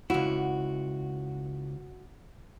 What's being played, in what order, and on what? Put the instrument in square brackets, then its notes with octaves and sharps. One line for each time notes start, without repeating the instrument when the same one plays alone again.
[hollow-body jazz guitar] C#2 E4 [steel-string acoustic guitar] F#4